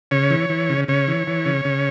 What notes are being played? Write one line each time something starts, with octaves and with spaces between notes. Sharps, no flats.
C#3 C#5
E3
E3
C#3
C#3 C#5
E3
E3
C#3
C#3